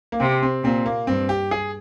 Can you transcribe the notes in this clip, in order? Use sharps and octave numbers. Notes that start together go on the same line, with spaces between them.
A#3
C3 C4
C4
A#2 C4
A#3
G2 C4
G4
G#4